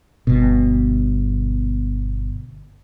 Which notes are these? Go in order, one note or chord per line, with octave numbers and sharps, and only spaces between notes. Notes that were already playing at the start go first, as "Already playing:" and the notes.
G1 B2